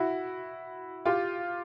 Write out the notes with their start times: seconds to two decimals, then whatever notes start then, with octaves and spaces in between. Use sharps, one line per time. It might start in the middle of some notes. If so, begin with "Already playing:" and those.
Already playing: E4 F#4
1.05 F4 G4